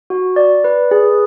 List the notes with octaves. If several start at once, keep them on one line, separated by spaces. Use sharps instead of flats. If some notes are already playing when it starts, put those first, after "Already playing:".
F#4
D5
B4
G#4